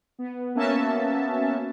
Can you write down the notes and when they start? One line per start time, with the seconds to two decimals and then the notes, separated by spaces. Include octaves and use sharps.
0.19 B3
0.55 A#3 B3 C#4 F#4 E5 A5